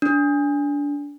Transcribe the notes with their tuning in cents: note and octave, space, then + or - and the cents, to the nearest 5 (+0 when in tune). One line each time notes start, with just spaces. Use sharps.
D4 -25